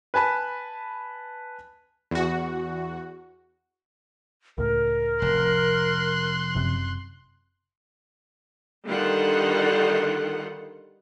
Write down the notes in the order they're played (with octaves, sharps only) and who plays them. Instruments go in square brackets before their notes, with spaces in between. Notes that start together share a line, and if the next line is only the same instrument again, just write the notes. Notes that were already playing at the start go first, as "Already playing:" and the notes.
[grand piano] B4 G#5 A5 B5
[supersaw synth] E2 F#4
[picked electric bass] C#2 A2 [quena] A#4
[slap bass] F1 [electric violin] C6 F#6
[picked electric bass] F#1 F#2 C3
[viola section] D3 D#3 G3 F4 F#5